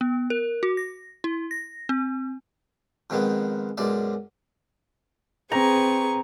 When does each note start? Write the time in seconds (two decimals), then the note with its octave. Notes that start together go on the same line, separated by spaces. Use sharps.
0.01 B3
0.30 A#4
0.63 F#4
0.77 A#6
1.24 E4
1.51 A#6
1.89 C4
3.10 F2 G#2 D#3 G#3 B3
3.77 B1 F#2 G#3 D5
5.52 C4 G#4 B4 A#5 C#6